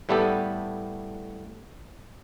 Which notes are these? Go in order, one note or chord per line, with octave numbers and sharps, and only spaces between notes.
A2 G3 A3 B3 G4 A4